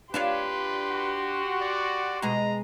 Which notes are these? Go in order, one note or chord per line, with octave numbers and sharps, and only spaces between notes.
D4 F4 G4 B4 C#5 C6
F#4
D5
B2 G#3 A#5